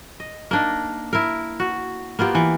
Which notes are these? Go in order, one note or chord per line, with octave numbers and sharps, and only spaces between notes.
D#5
A#3 D4 D#4
E4 A#4
F#4
A#3 B3 F4 G4
E3